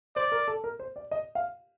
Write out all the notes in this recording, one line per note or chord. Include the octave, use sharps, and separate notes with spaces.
C5 D5
A#4
A4
A#4
C5
D5
D#5
F5